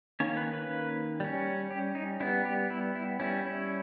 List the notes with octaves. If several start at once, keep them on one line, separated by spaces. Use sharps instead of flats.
D#3 A#3 C#4 C#5
B4
B4
G3 C#4
G4
D#4
G3 B3 E4
G4
E4
E4
G3 C#4 E4
E4